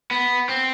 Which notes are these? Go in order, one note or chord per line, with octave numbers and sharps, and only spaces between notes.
B3
C4